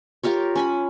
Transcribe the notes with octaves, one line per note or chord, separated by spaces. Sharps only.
F4 G4 A#4 C#5
C#4 G#5 B5